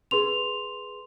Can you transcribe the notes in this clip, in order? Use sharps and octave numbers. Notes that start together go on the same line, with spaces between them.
G#4 B4 C6 F7